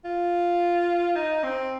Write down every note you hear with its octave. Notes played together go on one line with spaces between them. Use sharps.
F4
D#4
C4